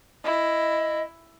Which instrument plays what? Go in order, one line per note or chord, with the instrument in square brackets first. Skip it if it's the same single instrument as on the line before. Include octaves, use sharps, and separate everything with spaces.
[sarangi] E4 [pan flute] D#5